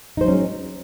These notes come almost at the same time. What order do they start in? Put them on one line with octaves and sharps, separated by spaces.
D#4 C5 F#3 C#4 G#3